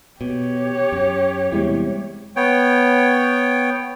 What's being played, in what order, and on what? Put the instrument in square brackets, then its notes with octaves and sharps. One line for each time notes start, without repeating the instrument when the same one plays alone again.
[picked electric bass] B2 [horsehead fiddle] G4 C#5
[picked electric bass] F#2
[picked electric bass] E2 C3 [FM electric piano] G3 G#3 E4
[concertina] B3 C#5 G5